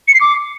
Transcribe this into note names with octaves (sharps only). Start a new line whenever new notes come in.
C#7
C7
D6